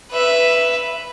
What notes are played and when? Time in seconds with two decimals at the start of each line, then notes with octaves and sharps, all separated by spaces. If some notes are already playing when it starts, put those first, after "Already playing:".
0.11 B4 E5